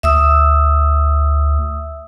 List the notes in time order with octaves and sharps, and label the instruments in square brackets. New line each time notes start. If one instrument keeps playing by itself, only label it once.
[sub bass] D2 [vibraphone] E5 D#6 E6